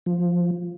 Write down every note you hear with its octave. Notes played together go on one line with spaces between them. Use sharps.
F3